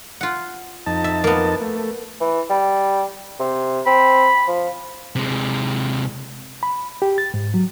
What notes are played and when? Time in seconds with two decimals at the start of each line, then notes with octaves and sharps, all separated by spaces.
0.21 F4 F#5
0.86 F2 D#4 A5
1.04 E5
1.24 A#3 B3
1.61 A3
2.21 E3
2.50 G3
3.40 C3
3.86 C4 B5
4.48 F3
5.16 C3 G#3
6.63 B5
7.02 G4
7.18 A6
7.34 G#2
7.54 F#3